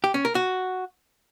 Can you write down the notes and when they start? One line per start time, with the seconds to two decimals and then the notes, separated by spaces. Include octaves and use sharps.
0.04 G4
0.14 C#4
0.25 A#4
0.35 F#4